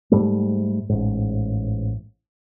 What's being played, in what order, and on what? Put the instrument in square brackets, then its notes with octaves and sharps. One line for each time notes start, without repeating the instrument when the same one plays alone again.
[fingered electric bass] G#2 G3 A3
A1 G#2